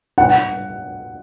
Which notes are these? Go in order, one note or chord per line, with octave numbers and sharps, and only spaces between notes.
F#5